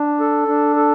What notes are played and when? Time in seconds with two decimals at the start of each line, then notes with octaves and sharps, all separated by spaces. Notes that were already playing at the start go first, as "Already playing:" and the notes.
Already playing: D4
0.20 A4
0.48 D4
0.76 A4